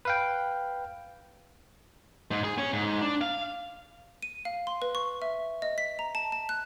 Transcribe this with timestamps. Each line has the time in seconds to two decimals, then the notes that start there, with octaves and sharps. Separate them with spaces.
0.05 B4 F5 G5
2.31 G#2
2.44 G#4
2.58 C#4
2.73 G#2
3.01 D4
3.21 F5
4.22 D#7
4.45 F5
4.67 C6
4.82 B4
4.95 C#6
5.22 E5
5.62 D#5
5.78 B6
5.99 A#5
6.15 A5
6.32 A5
6.49 F#6